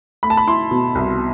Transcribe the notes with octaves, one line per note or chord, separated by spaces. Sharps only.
A3 B5
A5
B5
E4 C6
B2
C2